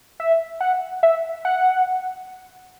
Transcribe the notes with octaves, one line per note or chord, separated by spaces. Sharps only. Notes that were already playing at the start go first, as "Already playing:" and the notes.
E5
F#5
E5
F#5